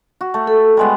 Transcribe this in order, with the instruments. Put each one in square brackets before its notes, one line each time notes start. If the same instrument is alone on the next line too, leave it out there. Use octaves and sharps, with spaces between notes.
[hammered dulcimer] F#4
A3
[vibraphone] A4
[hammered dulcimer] G3 G#3 B3